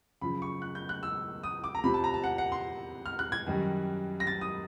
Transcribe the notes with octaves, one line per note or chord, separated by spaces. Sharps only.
F#2 C#3 F3 B5
C#6
F#6
G6
F#6
E6
D#6
D6
A#5
F2 C3 F3 B5
A5
A#5
A5
F#5
F#5
C6
F6
F#6
G#6
F#2 D#3 G3
A#6
A6
D#6